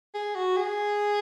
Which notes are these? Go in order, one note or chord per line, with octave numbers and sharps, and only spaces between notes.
G#4
F#4
G#4